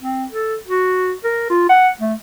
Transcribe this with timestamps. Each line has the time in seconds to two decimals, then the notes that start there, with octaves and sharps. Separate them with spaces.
0.02 C4
0.32 A4
0.67 F#4
1.24 A#4
1.50 F4
1.69 F#5
2.00 A3